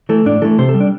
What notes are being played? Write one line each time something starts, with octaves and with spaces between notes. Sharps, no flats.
E3 A3 A4
A2 D4
E3 A3 A4
C3 C5
A4
G3
D4